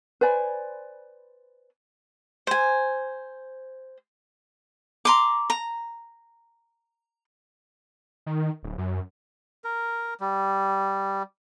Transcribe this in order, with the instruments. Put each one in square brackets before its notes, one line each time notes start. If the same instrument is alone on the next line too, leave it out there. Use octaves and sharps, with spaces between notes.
[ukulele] B4 C5 D5 G#5
[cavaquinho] C5 G#5
A#5 C6 D6
A#5
[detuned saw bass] D#3
D1
F#2
[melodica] A#4
G3